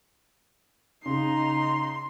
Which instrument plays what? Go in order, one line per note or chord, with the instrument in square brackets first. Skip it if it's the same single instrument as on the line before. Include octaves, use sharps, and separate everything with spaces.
[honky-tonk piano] C#3 [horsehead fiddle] D#4 A#5 [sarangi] C6